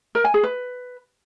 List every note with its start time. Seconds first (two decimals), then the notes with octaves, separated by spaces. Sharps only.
0.15 A#4
0.24 G#5
0.34 G#4
0.43 B4